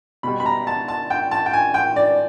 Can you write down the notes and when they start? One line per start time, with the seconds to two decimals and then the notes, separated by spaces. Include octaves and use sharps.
0.23 B2 G3 B5
0.40 B5
0.46 A#5
0.67 A5
0.88 A5
1.10 G5
1.31 A5
1.46 G5
1.53 G#5
1.74 G5
1.96 D5